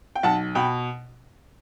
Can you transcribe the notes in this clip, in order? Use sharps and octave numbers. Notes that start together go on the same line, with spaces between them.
G5
B1 F#5 A5
B2 G5 B5